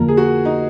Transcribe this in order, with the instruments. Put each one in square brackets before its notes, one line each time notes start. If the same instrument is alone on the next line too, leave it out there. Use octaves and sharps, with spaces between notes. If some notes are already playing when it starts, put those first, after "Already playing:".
Already playing: [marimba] F2 D3 F3 A#3 F4 [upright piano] A#4
[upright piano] G#4
F#4
D#4